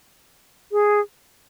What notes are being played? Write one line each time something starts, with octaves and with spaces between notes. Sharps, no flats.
G#4